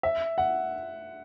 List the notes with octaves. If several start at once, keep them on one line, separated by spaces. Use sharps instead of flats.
E5
F#5